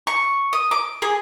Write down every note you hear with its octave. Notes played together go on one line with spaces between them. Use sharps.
C#6
D#6
D6
G#4